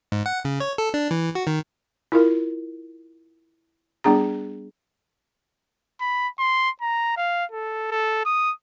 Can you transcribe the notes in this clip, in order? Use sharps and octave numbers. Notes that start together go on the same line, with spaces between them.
G#2
F#5
C#3
C#5
A4
D4
E3
F#4
D#3
E4 F4 A#4
G3 B3 D4 G#4 A#5
B5
C6
A#5
F5
A4
A4
D#6